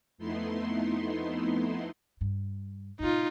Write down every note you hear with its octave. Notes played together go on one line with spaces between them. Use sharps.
F2 A3 B3 D#4 E4 C6
G2
A2 C3 D#4 F4